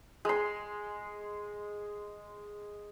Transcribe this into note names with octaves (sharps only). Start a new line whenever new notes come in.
G#3 C6